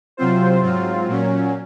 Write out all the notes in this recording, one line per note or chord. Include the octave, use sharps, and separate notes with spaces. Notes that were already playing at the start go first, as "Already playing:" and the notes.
C3 F#3 C4 F4 C5
G#2 F#3 C4 F4
A#2 F#3 C#4